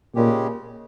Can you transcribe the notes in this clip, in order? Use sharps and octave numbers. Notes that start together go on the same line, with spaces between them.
A#2 C#3 G#3 C#4 G4